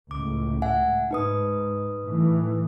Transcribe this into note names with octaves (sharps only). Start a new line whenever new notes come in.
C#2 A2 D6
E5 F#5 G#5
G#2 D#4 B4 D#6
A2 E3